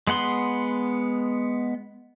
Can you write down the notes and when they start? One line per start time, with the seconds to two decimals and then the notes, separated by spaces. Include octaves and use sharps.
0.07 G#3 B3 F#5 C6